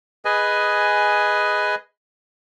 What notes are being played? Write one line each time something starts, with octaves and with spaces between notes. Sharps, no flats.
G#4 B4 D#5 G#5